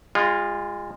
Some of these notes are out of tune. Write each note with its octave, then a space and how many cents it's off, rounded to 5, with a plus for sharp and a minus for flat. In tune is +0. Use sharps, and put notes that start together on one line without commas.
G#3 -35 F4 +0